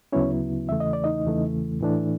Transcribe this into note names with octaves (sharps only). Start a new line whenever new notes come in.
D2 C#3 F#3 B3 C#4 E4 C#5
E2 C#3 E3 A3 E5
D#5
D5
D#4 D#5
E2 C#3 E3 A3
A2 E3 A3 D4